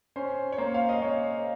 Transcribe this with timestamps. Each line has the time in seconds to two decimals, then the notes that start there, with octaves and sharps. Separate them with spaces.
0.16 C#4 C5
0.52 C#5
0.58 A#3 C5
0.74 F5
0.89 D#5
1.02 A#3 C#5